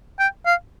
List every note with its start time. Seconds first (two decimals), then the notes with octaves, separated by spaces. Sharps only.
0.19 G5
0.46 F5